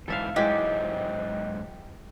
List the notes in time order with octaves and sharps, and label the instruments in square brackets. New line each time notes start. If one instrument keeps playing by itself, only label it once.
[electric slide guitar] G#2 E3 [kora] A4 E5 F5
[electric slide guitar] G#2 F#3 [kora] E3 G#3 [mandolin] G4 [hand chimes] D#5